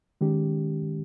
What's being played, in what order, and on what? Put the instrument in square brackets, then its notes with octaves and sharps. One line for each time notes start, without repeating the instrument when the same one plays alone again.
[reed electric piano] D#3 G#3 C#4 G4